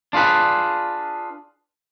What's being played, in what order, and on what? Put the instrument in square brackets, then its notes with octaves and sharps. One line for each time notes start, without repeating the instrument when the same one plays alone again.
[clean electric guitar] D4 F4 G#4 B4